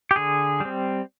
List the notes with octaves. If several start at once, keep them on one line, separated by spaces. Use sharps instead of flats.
G4
D3 G#4
G3 C4